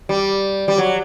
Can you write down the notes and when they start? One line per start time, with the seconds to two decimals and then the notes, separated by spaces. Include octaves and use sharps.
0.09 G3
0.68 G3
0.78 F#3